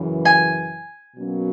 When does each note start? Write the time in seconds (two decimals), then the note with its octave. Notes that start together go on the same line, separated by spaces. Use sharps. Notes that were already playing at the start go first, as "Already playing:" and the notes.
Already playing: F#2 C#3 E3
0.25 G#5
1.16 B2 F#3 A#3 C#4